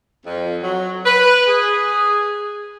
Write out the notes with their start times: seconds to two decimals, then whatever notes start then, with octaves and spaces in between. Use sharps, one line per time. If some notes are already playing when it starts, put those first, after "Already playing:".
0.25 F2
0.62 F#3
1.05 B4
1.47 G#4